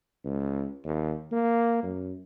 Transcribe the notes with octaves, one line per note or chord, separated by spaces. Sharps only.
C#2
D#2
A#3
F#2